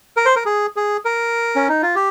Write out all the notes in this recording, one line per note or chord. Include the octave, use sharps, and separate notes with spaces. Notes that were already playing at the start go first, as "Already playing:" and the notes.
A#4
C5
A#4
G#4
G#4
A#4
C#4
D#4
F4
G4